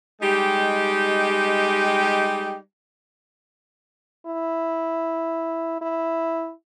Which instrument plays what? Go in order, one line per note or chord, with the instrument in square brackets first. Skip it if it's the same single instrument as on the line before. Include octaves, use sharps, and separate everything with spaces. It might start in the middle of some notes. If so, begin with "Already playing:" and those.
[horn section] G3 G#3 D#4 G4
[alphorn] E4
E4